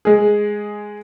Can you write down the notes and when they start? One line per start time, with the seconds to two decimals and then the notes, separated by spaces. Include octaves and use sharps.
0.05 G#3 G#4